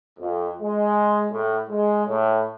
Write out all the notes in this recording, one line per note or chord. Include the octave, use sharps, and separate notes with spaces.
F2
G#3
A2
G#3
A2